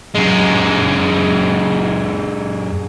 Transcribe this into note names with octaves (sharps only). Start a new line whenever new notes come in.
F#2 G#3